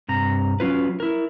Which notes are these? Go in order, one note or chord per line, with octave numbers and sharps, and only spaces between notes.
G2 C3 A#5
F#3 C#4 F4 B4
E4 A#4